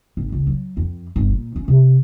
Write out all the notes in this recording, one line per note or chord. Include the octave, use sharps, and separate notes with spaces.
G#1
C#2
F#3
F2
G1
A#2
C#4
C3